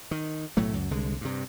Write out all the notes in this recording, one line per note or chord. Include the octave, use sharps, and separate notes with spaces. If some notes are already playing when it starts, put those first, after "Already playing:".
D#3
B1 A2 F#3 A3
C#2 F#2
C2 D3 G#3
G2 C3